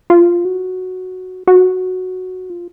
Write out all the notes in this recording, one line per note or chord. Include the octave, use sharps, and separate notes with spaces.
F4
F#4
F#4
F4